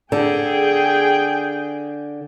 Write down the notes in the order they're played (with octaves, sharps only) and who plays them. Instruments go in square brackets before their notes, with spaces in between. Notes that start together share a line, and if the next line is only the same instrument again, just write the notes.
[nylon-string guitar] D3 [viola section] G#4 G5